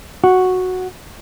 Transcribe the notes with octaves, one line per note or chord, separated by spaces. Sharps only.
F#4